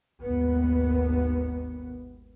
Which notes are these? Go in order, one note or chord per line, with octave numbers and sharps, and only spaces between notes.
G#1 D#2 B3